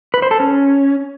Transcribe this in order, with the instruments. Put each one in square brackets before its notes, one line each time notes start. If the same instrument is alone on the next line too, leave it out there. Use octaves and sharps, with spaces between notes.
[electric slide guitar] B4
C5
A4
C#4